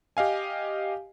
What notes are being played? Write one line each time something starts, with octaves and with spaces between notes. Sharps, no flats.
G4 D#5 F5 G#5